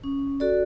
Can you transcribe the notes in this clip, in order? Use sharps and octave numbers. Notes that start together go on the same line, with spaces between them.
C#4
F#4 A4 D5